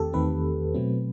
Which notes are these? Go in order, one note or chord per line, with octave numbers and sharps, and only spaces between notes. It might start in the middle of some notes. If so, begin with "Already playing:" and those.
Already playing: E2 D#3 A3 C4 G4 A4
E2 D#3 A3 C4 B4
B2 F#3 A3 C4